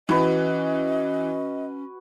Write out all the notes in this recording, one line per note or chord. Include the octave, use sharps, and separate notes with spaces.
E3 C#4 F#4 B4 D#5